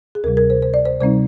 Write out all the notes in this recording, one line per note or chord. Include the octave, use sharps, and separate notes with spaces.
G#4
D2 C3 G3 A#4
A#4
C5
C5
D5
C5
C3 G3 C4 D#4 C5